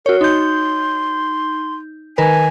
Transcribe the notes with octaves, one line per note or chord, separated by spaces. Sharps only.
F#4 A#4 C#5
D#4 C6 G6
D#3 A#4 B4 G#5